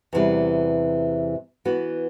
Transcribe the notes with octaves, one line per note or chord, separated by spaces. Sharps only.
E2 C3 E3 G3
E3 B3 F#4